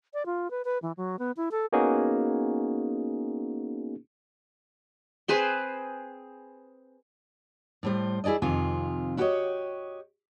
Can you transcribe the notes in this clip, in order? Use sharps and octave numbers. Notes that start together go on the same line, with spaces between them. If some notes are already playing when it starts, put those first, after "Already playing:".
D5
F4
B4
B4
E3
F#3
B3
E4
A4
A#3 B3 C#4 D#4 F#4 G#4
C4 G#4 B4 C5
A2 G3 C5
E4 G#4 A4 D5 D#5
F2 C3 D#3 F4 G#5
E4 F#4 G4 A#4 C#5 D#5